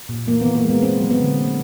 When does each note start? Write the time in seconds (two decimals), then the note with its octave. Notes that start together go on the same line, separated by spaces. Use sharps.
0.09 A#2
0.27 E3 A#3
0.41 E3 B3
0.55 A#3
0.64 G#3
0.69 B3
0.83 A#3 C4
1.01 F#3
1.10 B3
1.20 D3
1.39 A#3